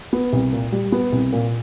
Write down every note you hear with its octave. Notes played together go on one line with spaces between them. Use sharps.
B3
C2
A#2
G3
B3
C2
A#2